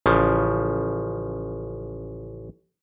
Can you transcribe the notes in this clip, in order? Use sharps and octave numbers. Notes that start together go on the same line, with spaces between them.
A1 C#3 F3